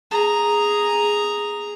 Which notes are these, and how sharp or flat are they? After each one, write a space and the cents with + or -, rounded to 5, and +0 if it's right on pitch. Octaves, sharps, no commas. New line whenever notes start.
G#4 +0 A#5 +0